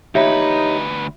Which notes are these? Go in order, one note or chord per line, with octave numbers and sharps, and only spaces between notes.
D2 D#4 F4 G4 B4 C#5 E5